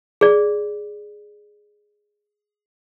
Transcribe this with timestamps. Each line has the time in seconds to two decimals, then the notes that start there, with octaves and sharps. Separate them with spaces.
0.21 G#4 D5